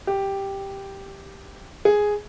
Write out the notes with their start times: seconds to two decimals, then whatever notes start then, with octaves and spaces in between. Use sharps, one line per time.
0.07 G4
1.85 G#4